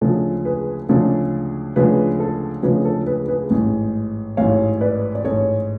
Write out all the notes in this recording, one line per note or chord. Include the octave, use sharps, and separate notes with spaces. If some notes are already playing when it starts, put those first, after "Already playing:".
D2 C#3 F3 G#3 D4 A4
G#4 B4
D2 C#3 F3 G#3 D4 A4
D2 C#3 F3 G#3 D4 G#4 B4
A4
D2 C#3 F3 G#3 D4 G#4 B4
A4
G#4 B4
G#4 B4
A1 G#2 G#3
A1 G#2 G#3 C#5 F5
B4 D5
D5
A1 G#2 G#3 A4 C#5